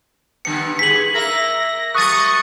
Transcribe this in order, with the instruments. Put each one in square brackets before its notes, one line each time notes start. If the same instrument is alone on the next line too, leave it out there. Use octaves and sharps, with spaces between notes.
[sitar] D3 G3 B3 [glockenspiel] C#7
[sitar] G#2 G#4 B4 [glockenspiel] B6 F#7
[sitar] A#3 A#4 E5 [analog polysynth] A#6
[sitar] F#3 A#3 [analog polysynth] C#6 D#6 [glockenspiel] F#6 A6